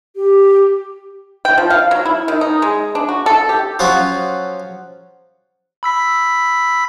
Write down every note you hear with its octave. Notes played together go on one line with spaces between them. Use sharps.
G4
G5
F3
F5
F#3
E4
D#3
D#4
G#3
D4
F#4
A4
G4
F3 F#3 C#4 F4 F#4
B5 E6 B6